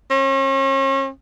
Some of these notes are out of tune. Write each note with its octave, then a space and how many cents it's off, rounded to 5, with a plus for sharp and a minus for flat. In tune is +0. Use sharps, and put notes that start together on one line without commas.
C#4 -40